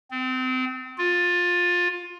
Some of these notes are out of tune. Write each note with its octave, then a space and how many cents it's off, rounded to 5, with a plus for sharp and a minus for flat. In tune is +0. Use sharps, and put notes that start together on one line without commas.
C4 -30
F4 +20